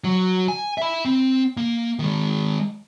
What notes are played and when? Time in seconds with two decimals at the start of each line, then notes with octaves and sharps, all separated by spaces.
0.04 F#3
0.48 G#5
0.78 E5 B5
1.05 C4
1.57 A#3
1.99 D#3 G#3